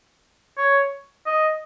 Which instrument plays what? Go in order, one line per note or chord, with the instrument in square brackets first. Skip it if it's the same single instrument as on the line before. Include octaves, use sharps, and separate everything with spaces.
[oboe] C#5
D#5